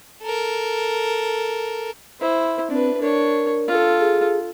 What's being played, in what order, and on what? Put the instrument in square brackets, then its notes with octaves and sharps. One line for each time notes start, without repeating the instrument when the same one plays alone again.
[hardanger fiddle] A4 A#4
[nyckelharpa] E4 C5
[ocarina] C4 [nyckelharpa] D4 B4
[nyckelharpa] D4 C#5 [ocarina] A#4
[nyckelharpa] F4 A4
[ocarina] G#4